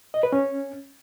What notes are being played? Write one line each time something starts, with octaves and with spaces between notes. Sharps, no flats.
D#5
B4
C#4